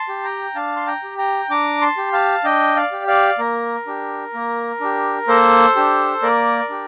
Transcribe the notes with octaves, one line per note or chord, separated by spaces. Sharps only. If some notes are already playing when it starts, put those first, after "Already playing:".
Already playing: A5 C6
G4
G5 A#5
D4 F5 A5
C6
G5 A#5
G4
G5 A#5
D4 A#5 D6
A5 C6
G4
F5 A5
D4 D#5 G5
D5 F5
G4
D5 F5
A#3 A#4
D4 G4
A#3
D4 G4
A#3 A4 C5
D4 G4
A#3 A#4 D5
D4 G4